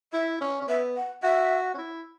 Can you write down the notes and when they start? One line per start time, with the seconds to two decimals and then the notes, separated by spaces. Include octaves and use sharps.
0.13 E4 E5
0.41 C#4
0.61 C#4
0.68 B3 E5
0.96 F#5
1.23 F#4 E5
1.74 C#4
1.78 E4